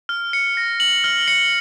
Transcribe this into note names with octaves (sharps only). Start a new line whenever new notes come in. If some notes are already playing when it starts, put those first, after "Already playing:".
F6
C#7
A#6
F#7
F6
C#7